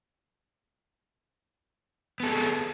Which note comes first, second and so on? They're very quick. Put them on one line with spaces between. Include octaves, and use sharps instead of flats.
B3 A4 G#4